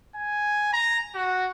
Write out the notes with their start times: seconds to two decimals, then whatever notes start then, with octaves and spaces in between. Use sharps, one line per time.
0.15 G#5
0.73 A#5
1.14 F#4